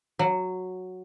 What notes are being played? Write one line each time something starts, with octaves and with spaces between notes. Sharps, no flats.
F#3